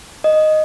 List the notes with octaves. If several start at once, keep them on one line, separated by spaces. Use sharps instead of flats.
D#5